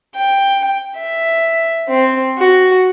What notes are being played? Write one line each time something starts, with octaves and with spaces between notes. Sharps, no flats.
G5
E5
C4
F#4